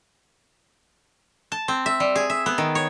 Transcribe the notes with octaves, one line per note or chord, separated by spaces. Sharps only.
A5
C4
E5
G3
G#4
E5
B3
D#3
C#5